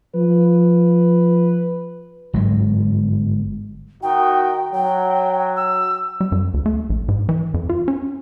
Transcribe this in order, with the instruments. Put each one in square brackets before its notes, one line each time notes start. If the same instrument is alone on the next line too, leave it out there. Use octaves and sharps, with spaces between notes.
[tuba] F3 [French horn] B4
[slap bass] G1 G#2 F#3
[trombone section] D#3 D#4 F#4 [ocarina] G5
[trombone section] F#3 [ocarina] G5
[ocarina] E6
[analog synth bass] G3
F#2
D2
A3
A#1
G#2
E3
F2
F4
C#4